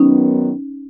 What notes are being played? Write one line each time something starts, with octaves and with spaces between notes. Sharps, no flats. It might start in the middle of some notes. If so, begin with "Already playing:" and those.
Already playing: F#2 D#3 F#3 B3 C#4 D#4